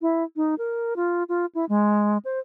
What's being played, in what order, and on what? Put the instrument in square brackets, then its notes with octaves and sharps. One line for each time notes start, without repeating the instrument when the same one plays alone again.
[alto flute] E4
D#4
A#4
F4
F4
E4
G#3
C5